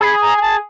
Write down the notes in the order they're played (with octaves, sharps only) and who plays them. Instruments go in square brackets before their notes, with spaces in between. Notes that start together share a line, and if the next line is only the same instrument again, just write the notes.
[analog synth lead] G#4 [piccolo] B5
[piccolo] A#5
G#5
A5